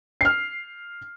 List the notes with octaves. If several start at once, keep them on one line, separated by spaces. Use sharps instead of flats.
F6 C7